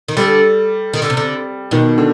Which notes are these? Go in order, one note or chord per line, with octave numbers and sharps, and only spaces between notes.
D#3
D3 G3
D#3
D3
C3
D3
B2 D#3
D3